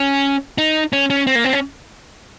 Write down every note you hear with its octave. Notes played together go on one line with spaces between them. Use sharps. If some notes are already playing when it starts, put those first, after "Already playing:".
Already playing: C#4
D#4
C#4
C#4
C4
A#3
C4
C#4